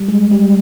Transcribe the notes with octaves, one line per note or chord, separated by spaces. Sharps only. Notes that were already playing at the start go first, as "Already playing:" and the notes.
Already playing: G3
G#3
G3